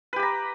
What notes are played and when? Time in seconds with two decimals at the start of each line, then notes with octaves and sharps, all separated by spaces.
0.13 B4
0.16 G4
0.19 B5
0.23 A#5